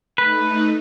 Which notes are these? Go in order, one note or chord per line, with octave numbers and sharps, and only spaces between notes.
A3 D#4 B4